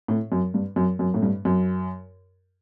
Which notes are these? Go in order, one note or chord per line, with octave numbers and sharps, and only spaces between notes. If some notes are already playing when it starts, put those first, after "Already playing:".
A2
F#2
G2
F#2
F#2
A2
G2
F#2